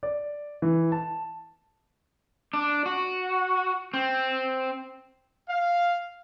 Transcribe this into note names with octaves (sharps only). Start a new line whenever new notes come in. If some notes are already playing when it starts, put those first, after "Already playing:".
D5
E3
A5
D4
F#4
C4
F5